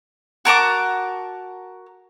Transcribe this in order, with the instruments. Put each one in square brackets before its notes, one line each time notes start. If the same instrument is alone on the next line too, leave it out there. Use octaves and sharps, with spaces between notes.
[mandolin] F#4 A#4 A5 D6